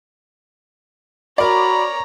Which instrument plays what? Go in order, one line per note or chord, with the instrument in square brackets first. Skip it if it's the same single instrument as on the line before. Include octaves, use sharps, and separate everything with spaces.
[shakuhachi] F#4 [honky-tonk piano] A#4 D5 [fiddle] C#5 A#5 [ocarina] B5